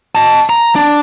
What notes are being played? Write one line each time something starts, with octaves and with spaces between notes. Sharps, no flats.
D#5 A5
A#5
D4